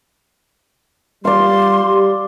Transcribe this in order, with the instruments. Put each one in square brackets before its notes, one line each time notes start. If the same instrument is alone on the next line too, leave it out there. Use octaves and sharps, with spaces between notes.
[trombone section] G3 [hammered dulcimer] D5 F5 [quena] C6
[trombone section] G3